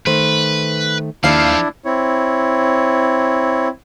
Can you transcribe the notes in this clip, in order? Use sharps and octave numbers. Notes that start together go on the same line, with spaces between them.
D#3 A3 B4 C5
D#2 F3 D4 E4 A4 F5 C7
C4 E4 C#5